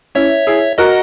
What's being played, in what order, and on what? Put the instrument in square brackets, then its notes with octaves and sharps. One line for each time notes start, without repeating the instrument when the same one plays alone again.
[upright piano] C#4 E4 [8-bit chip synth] C#5 E5
[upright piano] E4 G#4
[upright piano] F#4 A#4 [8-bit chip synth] D#5 F#5